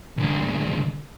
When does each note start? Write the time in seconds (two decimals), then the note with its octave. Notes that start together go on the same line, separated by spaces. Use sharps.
0.17 C2 D3